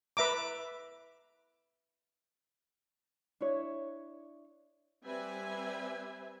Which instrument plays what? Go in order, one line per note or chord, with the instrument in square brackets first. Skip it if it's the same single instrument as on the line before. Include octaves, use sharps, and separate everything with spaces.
[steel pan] B4 E5 A#5 D6
[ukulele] D4 E4 C#5
[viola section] G3 C4 B4 E5 G#5